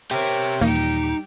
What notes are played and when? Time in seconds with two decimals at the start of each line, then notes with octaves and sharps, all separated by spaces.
0.11 G4 A#4 C#5 E5 G5
0.61 D#2 A#2 E3 G3 A#3 D#4 G4